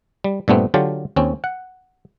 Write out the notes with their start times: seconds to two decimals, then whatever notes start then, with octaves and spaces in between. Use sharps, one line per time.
0.24 G3
0.48 G2 A#2 A3 B3 C4
0.74 D3 F#3 F4 G4 A5
1.16 D#2 C4 C#4
1.44 F#5